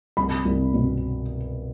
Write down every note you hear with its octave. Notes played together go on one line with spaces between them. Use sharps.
C2 B5
C2
B2